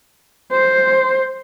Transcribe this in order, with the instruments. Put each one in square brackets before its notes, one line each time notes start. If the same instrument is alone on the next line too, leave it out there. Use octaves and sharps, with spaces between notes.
[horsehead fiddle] C5